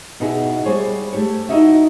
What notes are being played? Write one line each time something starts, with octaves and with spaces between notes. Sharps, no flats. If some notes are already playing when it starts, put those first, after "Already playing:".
B2 B3 D#4 E4 G#4
G3 G#4 C5 C#5
A3 G4 C#5
D#4 E4 F#4 D#5 E5